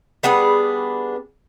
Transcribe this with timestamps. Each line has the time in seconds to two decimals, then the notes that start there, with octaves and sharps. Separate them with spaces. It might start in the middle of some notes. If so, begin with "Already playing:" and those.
0.23 G3 B3 D4 G#4